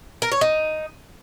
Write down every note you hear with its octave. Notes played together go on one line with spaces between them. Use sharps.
A#4
C#5
D#4